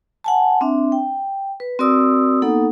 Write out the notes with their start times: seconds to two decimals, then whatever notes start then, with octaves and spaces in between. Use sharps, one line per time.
0.24 F#5 G#5 A5
0.61 C4 D4 E5
0.92 G5
1.60 B4
1.79 C4 F#4 A#4 D5 D#6 E6
2.42 A#3 B3 D#4 A4 F#5